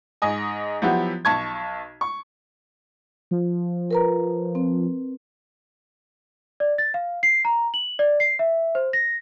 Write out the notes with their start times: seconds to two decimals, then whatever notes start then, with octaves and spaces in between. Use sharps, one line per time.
0.22 G#2 D#5 G#5
0.82 F3 F#3 B3 E4 F#4 G4
1.25 B1 A5 C#6 G#6
2.01 C#6
3.31 F3
3.91 A#4 B4 A#5
4.55 C4
6.60 D5
6.78 A6
6.94 F5
7.23 C7
7.45 A#5
7.74 F#7
7.99 D5
8.20 C7
8.39 E5
8.75 C5
8.93 A#6